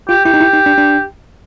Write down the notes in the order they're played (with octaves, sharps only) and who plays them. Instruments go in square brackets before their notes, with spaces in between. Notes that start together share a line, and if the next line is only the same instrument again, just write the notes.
[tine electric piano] F4 [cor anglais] G4
[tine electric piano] E4 [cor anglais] G4
[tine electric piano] D#4
E4
D#4
D4
D4